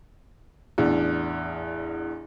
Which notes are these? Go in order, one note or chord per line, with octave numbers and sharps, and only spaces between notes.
A1 E2 D4